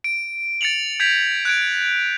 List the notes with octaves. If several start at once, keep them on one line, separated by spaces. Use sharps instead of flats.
D7
A6 C#7 D7 F7 F#7
G6 G#6 B6 D7 F7
F#6 G#6 D7